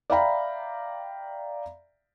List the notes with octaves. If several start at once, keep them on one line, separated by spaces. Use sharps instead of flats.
D5 E5 F5 G5 A#5 B5